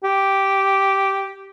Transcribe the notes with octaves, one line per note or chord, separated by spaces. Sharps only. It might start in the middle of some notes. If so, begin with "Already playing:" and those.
G4